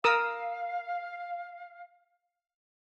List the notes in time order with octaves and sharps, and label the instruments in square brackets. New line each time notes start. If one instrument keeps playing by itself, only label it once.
[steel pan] A#4 D#6 E6 [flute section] F5